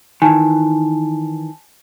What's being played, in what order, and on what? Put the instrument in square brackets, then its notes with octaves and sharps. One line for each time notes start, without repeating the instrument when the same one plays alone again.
[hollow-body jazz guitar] D#3 E3 [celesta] G#5 A5